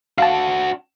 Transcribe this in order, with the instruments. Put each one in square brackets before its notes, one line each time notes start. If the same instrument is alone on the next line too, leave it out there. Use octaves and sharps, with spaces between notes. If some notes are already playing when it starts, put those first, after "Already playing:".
[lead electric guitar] D4 F#4 [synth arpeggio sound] F5 A5